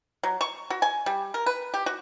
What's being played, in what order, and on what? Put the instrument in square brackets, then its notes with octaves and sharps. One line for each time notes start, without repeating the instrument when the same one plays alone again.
[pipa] F#3
C#6
F#4
G#5
G3
A#4
B4
G4
F#4